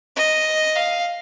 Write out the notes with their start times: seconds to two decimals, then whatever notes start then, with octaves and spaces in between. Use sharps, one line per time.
0.16 D#5
0.76 F5